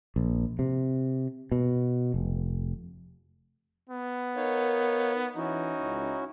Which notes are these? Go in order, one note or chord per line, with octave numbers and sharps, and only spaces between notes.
A#1
C3
B2
F1
B3
D#4 A#4 C#5 F5
E3 C#4 D#4 E4 F#4
C#2